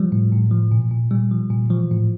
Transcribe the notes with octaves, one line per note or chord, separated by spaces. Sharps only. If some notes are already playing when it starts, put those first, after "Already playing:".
Already playing: F3 G3
A2
A2
F3
A#2
A#2
A#2 G3
F3
A#2
E3 F3
A2